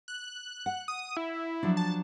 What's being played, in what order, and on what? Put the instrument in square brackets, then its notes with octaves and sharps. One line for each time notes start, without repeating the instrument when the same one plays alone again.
[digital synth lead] F#6
[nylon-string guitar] F#5
[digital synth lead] D#6
E4
[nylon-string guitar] F3 F#3 D4
[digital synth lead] A5